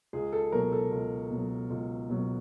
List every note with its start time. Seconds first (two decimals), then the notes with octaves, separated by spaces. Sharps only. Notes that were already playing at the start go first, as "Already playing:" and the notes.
0.13 C#2 G#4
0.33 A4
0.52 B2 F#3 A#4
0.72 A4
0.91 C#2
1.31 B2 F#3
1.70 C#2
2.09 B2 F#3